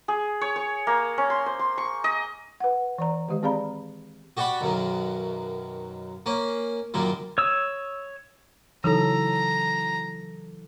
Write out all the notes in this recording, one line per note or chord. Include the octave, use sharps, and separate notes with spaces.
G#4
C#5
C#5
A#3
C#4
C6
C5
C6
C#6
D#5
B4 F#5
E3 D5 A#5
D#3 G#3 G4 D#5
C4 G#4 D5 F5 A#5 B5
F#4 G4 D5 F#5 B5 C#6
B1 F#2 D#3
A#3 C#4
F#2 A#2 D#3 G3
C#5 D#6 E6
C#3 E3 F#3 D#4 A4 A#5